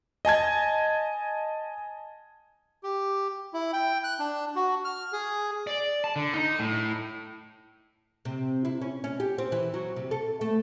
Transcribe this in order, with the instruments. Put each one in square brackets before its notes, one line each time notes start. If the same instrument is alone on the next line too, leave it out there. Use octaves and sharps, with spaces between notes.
[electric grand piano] D#5 G#5 A5 G#6
[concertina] G4
E4
G5
F#6
D4
F#4
F6
G#4
[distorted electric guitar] D5
A5
D3
D#4
A2
[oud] C3
E4
C#4
C#4
G4
C4
E3
F#3
C3
A4
A3